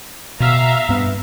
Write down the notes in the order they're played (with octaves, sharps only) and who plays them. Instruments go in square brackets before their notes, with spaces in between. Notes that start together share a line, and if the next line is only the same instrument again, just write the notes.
[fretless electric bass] B2 [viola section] E5 F5 A#5
[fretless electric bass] G2 B3